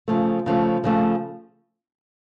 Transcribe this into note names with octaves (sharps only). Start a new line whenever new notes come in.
C#3 F3 A3
C#3 F3 A3
C#3 F3 A3